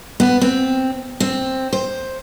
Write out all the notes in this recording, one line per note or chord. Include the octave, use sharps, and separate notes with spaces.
B3
C4
C4
C5